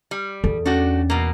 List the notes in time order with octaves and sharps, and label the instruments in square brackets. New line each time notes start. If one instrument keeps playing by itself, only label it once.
[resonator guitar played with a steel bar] G3
[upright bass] E2 [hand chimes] A4
[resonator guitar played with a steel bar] A3 D4 F#4 [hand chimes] C#4
[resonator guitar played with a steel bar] B2 A#3